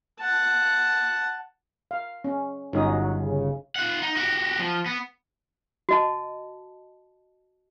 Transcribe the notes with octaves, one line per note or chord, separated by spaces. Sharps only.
F#5 A5
F5
C#4
G1 D3 F#3 C#4 D#4 F#4 D#6
C#3
F4 F#5
D#4
F#4 G4
F3
B3
F#4 D#5 A5